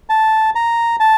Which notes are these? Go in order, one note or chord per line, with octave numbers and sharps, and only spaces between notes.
A5
A#5
A5